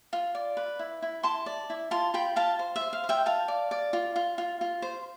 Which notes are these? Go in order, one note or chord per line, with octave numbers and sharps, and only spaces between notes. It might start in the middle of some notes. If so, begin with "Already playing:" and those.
F4
D5
B4
E4
E4
E4 A5 C6
D5
E4
F4 A5 C6
F4 G5 B5
F4 F5 A5
C5
E5
C5
F5
C5
E5 G5
F4 F5 A5
D5
D5
F4
F4
F4
F4
C5